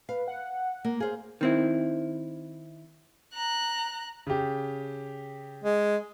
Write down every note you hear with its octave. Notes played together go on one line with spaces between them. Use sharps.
B4 F5
F#5
A#3
G#4 C5 F5
D#3 C4 E4
A#5 F#6
C#3 G4
G#3